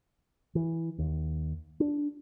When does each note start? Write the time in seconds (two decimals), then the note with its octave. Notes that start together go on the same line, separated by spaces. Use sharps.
0.55 E3
0.98 D#2
1.80 D4